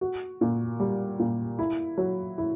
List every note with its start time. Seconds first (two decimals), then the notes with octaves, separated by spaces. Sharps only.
0.01 F#4
0.41 A#2
0.80 G3
1.19 A#2
1.59 E4
1.98 F#3
2.38 E4